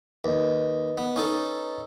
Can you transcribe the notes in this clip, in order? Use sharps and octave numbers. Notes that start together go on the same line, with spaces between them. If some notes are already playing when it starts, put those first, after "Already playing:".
D#2 B4 D#5
B3
C#4 D#4 A4